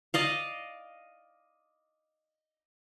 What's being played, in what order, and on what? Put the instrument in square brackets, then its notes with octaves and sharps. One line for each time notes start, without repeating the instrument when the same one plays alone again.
[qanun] D5 D#5 F5